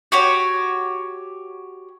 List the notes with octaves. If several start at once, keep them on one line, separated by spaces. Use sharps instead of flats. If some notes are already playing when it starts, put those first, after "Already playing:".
F#4 G4 C#5